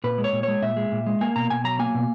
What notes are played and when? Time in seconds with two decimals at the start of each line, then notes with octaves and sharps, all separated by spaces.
0.04 A#2 B4
0.18 G#3
0.24 C#5
0.33 A#2
0.43 C#5
0.48 G#3
0.62 A#2 E5
0.77 G#3
0.92 A#2
1.07 G#3
1.21 A#3 G#5
1.36 B2 A#5
1.50 B2 G#5
1.64 F#3 A#5
1.79 A#3 G#5
1.95 B2